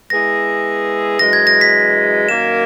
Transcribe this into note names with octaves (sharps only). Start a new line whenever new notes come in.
G#3 B3 E4 G#4 A#6
F#2 E3 G#3 A#6
G#6
A#6
B6
F#2 D#3 A#3 E7